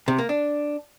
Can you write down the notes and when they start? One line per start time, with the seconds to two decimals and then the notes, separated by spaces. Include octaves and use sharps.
0.08 C3
0.18 A#3
0.29 D4